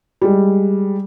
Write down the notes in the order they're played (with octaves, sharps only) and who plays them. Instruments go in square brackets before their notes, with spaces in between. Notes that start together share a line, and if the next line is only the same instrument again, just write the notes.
[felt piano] G3 G#3